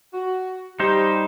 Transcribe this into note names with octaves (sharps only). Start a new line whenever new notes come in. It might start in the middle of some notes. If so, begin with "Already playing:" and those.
F#4
G3 D#4 G4 C5